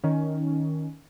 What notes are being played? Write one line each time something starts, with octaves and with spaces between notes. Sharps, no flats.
D#3 C#4